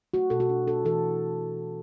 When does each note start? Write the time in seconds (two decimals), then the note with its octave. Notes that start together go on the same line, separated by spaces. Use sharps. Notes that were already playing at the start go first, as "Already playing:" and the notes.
0.14 A3 F#4
0.30 B2 A4
0.40 F#4
0.49 D4
0.67 D4 A4
0.85 E3 A4